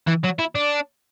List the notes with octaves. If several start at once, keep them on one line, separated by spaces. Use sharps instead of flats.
E3
F#3
E4
D4